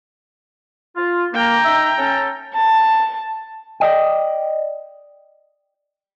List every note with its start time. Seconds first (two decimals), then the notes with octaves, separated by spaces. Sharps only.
0.97 F4
1.34 A#3 G5 A#5
1.65 D#4 E5
1.98 C#4 A4
2.54 A5
3.80 D5 D#5 G5